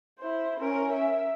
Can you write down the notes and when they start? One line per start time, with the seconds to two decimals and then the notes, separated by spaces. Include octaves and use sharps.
0.19 E4 C5
0.60 C#4 A#4
0.93 E5